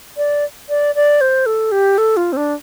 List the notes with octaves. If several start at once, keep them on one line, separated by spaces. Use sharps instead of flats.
D5
D5
D5
C5
A4
G4
A4
F4
C4
D4